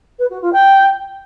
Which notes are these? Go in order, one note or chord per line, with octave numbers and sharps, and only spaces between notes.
B4
F#4
F4
G5